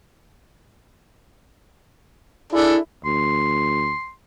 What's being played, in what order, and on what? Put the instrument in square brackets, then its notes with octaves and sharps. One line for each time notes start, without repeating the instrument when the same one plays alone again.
[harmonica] D4 G#4 A4 [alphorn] E4
[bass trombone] D2 [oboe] C6